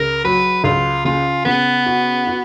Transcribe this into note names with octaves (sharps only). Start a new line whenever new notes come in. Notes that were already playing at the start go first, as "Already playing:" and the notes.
Already playing: C#2 A#4
F#3 B4
C#2 F4
C#3 F4
C#3 B3
F#4
F#4